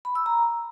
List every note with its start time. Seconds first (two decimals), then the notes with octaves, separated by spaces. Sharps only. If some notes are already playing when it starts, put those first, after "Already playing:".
0.05 B5
0.15 E6
0.26 A#5